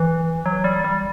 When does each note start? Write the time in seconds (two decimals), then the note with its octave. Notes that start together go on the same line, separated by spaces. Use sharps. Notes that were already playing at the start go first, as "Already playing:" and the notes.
Already playing: E3
0.46 F#3
0.64 G3
0.84 G3